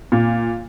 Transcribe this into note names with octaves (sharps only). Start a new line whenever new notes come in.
A#2